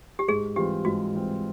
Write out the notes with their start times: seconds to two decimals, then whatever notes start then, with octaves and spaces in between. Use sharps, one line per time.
0.19 G4
0.28 G#2 G#4
0.56 E3 G3 C4 F4 G4
0.85 G#2 F#4
1.14 E3 G3 C4 F4